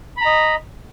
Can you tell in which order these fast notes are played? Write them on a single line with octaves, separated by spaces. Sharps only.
B5 A#5 D#5